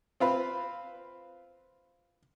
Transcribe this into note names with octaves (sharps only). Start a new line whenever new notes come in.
C4 F4 B4